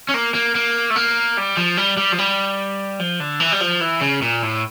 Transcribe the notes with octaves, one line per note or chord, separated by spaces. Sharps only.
C#4
A#3
A#3
A#3
A3
A#3
G3
F3
G3
G3
F3
G3
F3
D3
E3
G3
F3
E3
C#3
A#2
A2